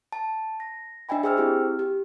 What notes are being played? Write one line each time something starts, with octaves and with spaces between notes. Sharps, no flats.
A5
A#6
D4 D#5 E5 G5 G#5 B5
G#4 C5 G5 E6 F6
C4 E4 G4
G4